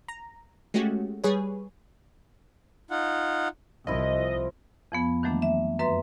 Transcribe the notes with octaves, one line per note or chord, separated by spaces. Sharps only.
A#5
G#3 A3 C#4 F#4 G4
G3 G#4 B4 C#5
D#4 F4 F#5
C2 F3 E4 D#5
F2 F3 B3
D#3 E3 F#3 A3 A#3 D4
E5
F#2 B4 E5 A#5 C6